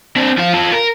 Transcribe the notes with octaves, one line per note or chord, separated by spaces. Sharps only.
C4 D4
F3 F4
F4 A4
A#4